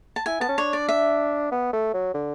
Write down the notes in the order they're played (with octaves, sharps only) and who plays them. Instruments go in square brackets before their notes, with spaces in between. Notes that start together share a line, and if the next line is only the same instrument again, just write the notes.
[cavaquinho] A5
[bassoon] E4 [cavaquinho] G#5
[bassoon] B3 [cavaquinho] A5
[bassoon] C#4
[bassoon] D4 [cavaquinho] C#5
[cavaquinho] D5
E5
[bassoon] B3
A3
F#3
D3